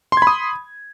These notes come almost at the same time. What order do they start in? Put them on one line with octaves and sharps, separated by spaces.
C6 G#6 B5 D#6